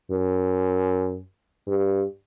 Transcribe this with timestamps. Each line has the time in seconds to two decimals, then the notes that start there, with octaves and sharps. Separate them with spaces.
0.11 F#2
1.67 G2